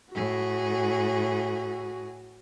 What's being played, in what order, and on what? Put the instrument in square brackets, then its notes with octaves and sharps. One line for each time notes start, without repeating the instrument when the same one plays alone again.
[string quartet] A2 G#4 [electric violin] F#4